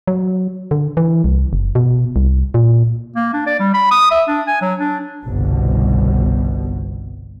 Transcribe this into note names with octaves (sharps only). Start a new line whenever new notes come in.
F#3
D3
E3
C2
F#1
B2
C2
A#2
A#3
D4
D5
G3
B5
D#6
E5
D4
G#5
F#3
D4
G1 C2 B2